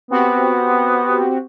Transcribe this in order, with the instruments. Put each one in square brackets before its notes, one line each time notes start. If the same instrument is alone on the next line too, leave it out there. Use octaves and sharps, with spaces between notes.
[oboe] B3 [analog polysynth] C4 F#4 G4